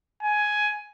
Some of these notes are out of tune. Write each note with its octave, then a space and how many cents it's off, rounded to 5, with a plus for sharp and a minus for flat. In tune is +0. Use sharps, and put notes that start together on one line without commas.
G#5 +10